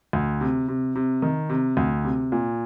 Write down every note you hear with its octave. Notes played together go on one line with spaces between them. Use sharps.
D2
C3
C3
C3
D#3
C3
D2
C3
A#2